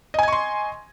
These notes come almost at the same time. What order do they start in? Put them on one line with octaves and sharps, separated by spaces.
D#5 G#5 G#6 C#6 C6